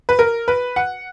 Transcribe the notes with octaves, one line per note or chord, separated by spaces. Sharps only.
B4
A#4
B4
F#5